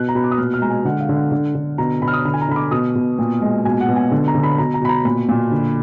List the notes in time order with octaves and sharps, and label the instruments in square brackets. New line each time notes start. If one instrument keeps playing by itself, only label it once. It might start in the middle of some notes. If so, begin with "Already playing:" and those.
Already playing: [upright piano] B2 F#6
A#5
B2 B5
D6
D#6
A#2 F6
F6
G#3 A#5
G#5
D3 F#5
F5
D3
F#5
D3
D3
B2 A#5
B2 B5
F6
D#6
D3 B5
G#5
A#5
D3 B5
D6
B2 D#6
B2
A#2
G#3
B2 G#5
F#5
B2
G#5
D3
A#5
D3
B5
B2 A#5
A#5
B2 B5
A#5
A#2 B5
A#2
D3